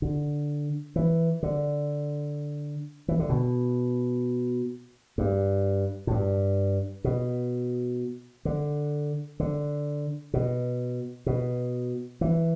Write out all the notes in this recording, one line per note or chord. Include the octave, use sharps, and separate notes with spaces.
D3
E3
D3
E3
D3
B2
G2
A2
G2
B2
D3
D3
B2
B2
E3